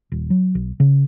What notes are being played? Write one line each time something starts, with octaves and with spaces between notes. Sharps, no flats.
D#1
F#3
B1
C#3